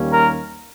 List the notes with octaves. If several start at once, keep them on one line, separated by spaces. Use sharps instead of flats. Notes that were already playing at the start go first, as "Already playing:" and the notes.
Already playing: D#2 D#3 G3 A#3 C#4
A#4